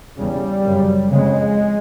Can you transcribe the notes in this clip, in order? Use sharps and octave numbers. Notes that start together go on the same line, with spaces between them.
E2 C#3 G3
F#2 C#3
F2 C#3 G#3